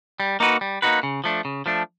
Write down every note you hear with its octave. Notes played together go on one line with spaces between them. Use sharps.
G3
A#3 D#4 F#4 B4
G3
A#3 D#4 F#4 B4
C#3
F3 A3 D4
C#3
F3 A3 D4